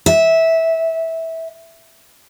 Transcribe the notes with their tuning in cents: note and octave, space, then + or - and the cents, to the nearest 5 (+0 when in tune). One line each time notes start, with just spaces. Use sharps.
E5 -15